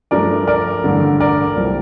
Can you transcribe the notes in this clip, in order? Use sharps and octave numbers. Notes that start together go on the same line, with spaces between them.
G2 F3 A3 D4 A#4 D5
A#4 D5
A1 G2 D3
A#4 D5
C2 A#2 G3 C4